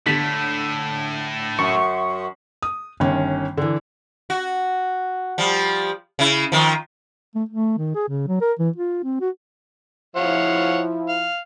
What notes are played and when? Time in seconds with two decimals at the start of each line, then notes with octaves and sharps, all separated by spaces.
0.06 A2 D3 A3 B6 F#7
1.59 F#2 C#6
2.62 D#6
3.00 G1 D#3 C#4
3.57 D3 E3
4.30 F#4
5.38 F3 G3
6.19 C#3 E4
6.52 D#3 F3
7.35 A3
7.49 A3
7.78 D#3
7.95 G#4
8.09 C#3
8.28 F#3
8.41 A#4
8.59 E3
8.76 F4
9.04 C4
9.21 F#4
10.16 F3 E4 C#5 F5 F#5
11.09 F5